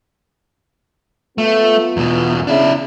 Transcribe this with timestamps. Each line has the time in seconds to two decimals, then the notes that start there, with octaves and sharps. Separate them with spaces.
1.38 A3 B3 F4
1.97 E2 B2
2.47 C#3 D4 E4